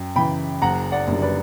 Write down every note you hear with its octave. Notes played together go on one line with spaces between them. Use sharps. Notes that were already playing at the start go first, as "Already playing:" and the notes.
Already playing: F#2 G5
C#3 E3 G5 B5
F#1 F#5 A#5
D5 F#5
F#2 D3 G3 A#3
B4 D5